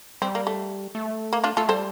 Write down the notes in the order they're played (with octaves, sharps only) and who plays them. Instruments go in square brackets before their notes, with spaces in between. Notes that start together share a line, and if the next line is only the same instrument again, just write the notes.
[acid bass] G3 [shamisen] C4
[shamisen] A#3
A3
[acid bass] A3
[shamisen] A#3
D4 F4
[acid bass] A3 [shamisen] F4 A4
[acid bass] G3 [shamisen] A4 C5